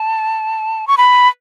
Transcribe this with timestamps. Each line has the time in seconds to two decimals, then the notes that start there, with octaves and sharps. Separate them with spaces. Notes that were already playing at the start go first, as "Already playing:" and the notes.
Already playing: A5
0.88 C#6
0.97 B5